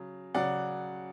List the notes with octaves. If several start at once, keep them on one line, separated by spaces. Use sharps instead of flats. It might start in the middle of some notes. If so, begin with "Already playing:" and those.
Already playing: C#3 F#3
C#3 F#3 D5 F#5